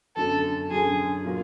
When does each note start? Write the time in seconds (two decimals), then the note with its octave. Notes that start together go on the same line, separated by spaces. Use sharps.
0.16 F#2 D3 F#3 A4
0.71 F#2 D3 F#3 G#4
1.25 A#2 F#3 A#3